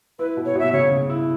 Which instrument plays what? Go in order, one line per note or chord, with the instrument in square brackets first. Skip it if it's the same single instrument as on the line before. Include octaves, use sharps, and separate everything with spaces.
[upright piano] E4 [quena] B4
[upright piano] B2
[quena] C#5
[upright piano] B2 [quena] E5
[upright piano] C#3 [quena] C#5
[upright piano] C#3
E4